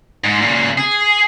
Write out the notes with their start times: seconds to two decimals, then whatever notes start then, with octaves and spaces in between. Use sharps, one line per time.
0.24 G#2
0.41 A#2 C#3
0.78 G#4